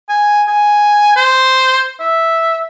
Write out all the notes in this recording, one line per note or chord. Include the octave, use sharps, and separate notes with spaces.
G#5
G#5
C5
E5